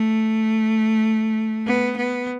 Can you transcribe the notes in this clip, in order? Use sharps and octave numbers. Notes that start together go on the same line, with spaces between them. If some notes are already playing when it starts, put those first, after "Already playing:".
Already playing: A3
B3
B3